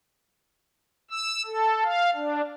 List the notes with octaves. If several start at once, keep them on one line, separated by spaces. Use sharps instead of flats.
E6
A4
F5
D4